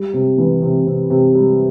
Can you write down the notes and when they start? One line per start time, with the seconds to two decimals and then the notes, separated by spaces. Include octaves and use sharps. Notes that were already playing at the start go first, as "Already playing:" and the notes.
Already playing: G3
0.13 C3
0.38 E3
0.62 C3
0.87 C3
1.10 C3
1.35 G3